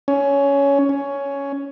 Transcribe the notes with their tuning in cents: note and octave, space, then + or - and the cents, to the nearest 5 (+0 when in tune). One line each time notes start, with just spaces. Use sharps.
C#4 +15
C#4 +10